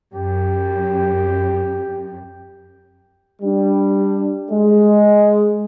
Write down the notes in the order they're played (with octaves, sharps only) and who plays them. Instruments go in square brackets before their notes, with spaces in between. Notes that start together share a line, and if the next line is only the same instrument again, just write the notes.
[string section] F#2 [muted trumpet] G4
[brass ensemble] G3 D4
G#3